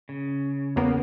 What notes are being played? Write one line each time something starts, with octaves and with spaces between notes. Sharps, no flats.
C#3
E2 A#3 B3 C#4